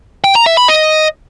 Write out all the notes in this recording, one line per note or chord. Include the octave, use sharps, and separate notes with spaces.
G5
A#5
E5
B5
D#5